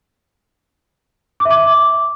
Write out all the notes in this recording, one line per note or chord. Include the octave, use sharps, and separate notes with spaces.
D6
E5
D6